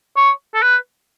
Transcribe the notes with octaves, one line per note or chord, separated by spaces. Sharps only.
C#5
A4
B4